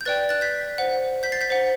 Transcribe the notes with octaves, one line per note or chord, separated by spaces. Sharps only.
G6
B4 D5 G5 F#6 A6
F#6 A6
G6 B6
C5 F#5
G6 B6
A6 C7
G6 B6
C5 F#5